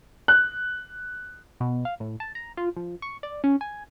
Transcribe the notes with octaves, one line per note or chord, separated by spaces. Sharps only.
F#6
B2
F5
A2
A5
A#5
F4
F3
C#6
D5
C#4
G#5